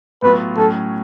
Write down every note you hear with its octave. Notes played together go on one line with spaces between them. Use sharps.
A2 F#3 B3 F4 B4
A2 F#3 C#4 A4